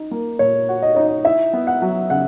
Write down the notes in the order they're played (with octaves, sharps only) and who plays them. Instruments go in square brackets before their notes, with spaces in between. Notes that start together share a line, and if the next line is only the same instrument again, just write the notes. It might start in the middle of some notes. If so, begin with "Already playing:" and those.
Already playing: [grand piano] D#4
A#3
[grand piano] A#2 [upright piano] C#5
[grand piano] F#4
[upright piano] D#5
[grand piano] D#4 [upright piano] C#5
[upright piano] D#5
[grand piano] E4 [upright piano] E5
[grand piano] B3
[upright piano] F#5
[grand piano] F#3
[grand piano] C#3 [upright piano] F#5